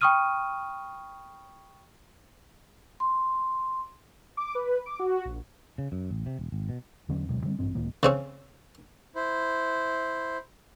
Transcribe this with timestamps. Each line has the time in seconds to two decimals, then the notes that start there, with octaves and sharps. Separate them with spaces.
0.01 G5 B5 C#6 D#6 F6 D#7
3.00 C6
4.37 D6
4.55 B4
4.86 D6
4.99 F#4
5.25 A#1
5.78 C#3
5.92 F#2
6.11 A1
6.26 C3
6.39 E1
6.52 G#1
6.69 B2
7.09 E2 D3 F#3 C#4
7.29 D2 B2 F#3 G#3
7.43 D3 G3 C4
7.59 A1 G2 C4
7.75 C#2 A2 D#3 A#3
8.03 C#3 C4 C#4
9.15 E4 C5